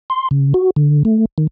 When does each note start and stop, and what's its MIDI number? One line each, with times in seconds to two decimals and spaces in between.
0.10 0.28 84
0.31 0.53 49
0.54 0.70 66
0.76 1.03 50
1.05 1.25 57
1.38 1.47 51